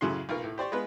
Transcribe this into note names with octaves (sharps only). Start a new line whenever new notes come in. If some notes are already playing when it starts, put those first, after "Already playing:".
F#2 A2 C#3 F#4 C6
B1 F4 A#4
A2
G4 C5 D5 C#6
G#3 B3 F4 B4